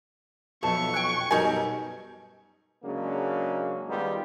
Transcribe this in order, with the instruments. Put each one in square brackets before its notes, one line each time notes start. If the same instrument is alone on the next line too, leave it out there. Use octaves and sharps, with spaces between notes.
[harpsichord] B1 F2 [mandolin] E5 A5 [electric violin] C#6
[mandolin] G5 G#5 F#6
[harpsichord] F#2 B2 G3 [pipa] D#4 G#5 [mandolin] A4 A#4
[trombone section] C#3 F#3 G#3 A#3 C#4 D4
D#3 G3 G#3 B3 D#4 F4